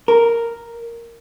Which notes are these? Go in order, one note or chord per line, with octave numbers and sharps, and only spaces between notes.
A#4